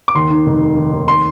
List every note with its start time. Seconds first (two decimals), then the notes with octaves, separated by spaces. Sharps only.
0.08 D6
0.15 D#2 C6
0.30 D#3
0.46 F1
0.62 D#3
0.77 D#3
0.92 D#2
1.08 C6